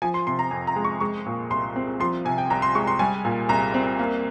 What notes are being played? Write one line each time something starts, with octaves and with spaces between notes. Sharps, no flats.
F3 G#5
C6
C3 C6
A#5
F2 G#5
A#5
G#3
C#6
G#3 C#6
A#2
C2 C6
C4
F3 C6
C3 G#5
G5
C2 A#5
C6
G#3 C#6
C6
G3 G#5
A#2
C2 A#5
C4
A#3